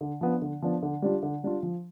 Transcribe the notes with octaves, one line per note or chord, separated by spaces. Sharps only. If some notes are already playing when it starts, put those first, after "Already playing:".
D3
F3 B3 D4
D3
F3 B3 D4
D3
G3 D4 F4
D3
G3 D4 F4
F3